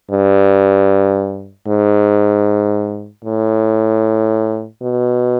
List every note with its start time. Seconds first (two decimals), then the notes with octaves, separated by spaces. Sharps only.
0.11 G2
1.68 G#2
3.25 A2
4.82 B2